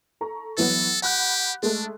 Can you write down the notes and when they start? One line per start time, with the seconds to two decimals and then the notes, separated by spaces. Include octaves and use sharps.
0.21 A4 A#5 C#6
0.58 E3 F#3 B3 A4
1.02 G4 F#5 B5 F#6
1.63 G#3 A3 D4